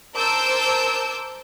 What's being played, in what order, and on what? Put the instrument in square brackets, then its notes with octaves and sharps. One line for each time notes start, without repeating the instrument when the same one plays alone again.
[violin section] A#4 C5 A5 D6 E6 G6